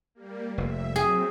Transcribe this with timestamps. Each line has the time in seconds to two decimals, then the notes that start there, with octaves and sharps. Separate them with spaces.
0.15 G3 A#3
0.58 F1 E5
0.96 F#3 C4 G#4